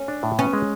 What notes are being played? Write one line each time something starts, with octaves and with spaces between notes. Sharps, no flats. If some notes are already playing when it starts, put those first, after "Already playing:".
Already playing: C#4
D4
A2
B3 C#4
G#3